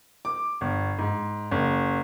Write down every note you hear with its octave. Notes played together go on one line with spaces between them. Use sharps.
D6
G1
G#2
F#1